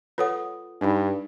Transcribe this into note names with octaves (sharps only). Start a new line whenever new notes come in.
F4 A4 B4 C#5 F#5 D#6
G2 D4 D#4